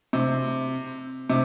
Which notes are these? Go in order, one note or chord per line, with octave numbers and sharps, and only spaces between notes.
C3
C3